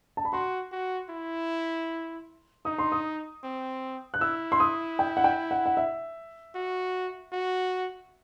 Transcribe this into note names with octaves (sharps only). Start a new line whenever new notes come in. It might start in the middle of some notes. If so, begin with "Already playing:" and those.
A5
B5
F#4 C6
F#4
E4
D#4 D#6
C6
D#6
C4
F#6
E4 E6
C6
D#6
G5
F#5
G5
F#5
F#5
E5
F#4
F#4